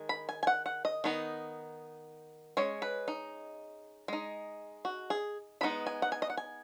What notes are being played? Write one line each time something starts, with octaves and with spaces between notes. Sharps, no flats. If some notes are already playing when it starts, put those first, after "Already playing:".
Already playing: D#3 G#3
B5
G#5
G#5
F#5
F#5
D#5
D#3 B3 D#4
G#3 C#4 C#5
B4
D#4
G#3 D#4
F#4
G#4
G#3 B3 D#4 B5
G#5
F#5
G#5
D#5
F#5
G#5